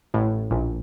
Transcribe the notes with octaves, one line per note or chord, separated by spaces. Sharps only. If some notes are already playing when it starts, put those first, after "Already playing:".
A1 A2
A#1 A#2